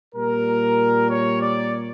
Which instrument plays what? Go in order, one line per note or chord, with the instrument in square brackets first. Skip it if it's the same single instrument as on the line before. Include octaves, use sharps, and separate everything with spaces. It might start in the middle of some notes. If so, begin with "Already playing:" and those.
[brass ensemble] A#2 G3 A#4
C#5
D5